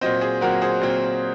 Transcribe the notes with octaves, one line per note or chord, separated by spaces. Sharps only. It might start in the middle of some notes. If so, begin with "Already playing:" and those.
A#2 F#3 C4 C5 D#5
G#4 C5
A#2 F#3 C4 F#4 A#4
G#4 C5
A#2 F#3 C4